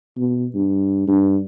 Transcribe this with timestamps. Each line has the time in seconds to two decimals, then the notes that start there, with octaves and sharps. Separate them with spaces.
0.17 B2
0.54 G2
1.07 G2